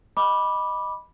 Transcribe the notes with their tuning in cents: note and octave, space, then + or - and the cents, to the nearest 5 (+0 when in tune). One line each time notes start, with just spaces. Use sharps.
D#5 +0 B5 -10 D6 +0